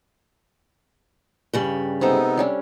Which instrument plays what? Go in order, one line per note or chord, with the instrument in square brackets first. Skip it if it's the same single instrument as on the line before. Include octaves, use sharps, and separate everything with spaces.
[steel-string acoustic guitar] G2 C#3 G3
[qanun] C3 G#3 A4 [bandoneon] B3 D#4
[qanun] G3 C#4 D4